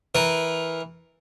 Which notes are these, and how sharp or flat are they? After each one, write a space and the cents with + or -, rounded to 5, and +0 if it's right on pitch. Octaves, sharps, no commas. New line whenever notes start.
E3 -10 A#4 +0